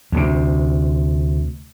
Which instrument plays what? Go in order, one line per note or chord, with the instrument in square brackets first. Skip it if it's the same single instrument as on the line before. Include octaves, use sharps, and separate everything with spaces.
[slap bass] D2 C3